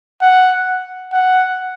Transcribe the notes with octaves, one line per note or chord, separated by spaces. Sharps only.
F#5
F#5